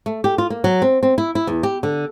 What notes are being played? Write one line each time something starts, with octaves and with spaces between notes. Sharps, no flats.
A3
G4
F4
A#3
F#3
C4
C4
E4
E4
E2
G4
D3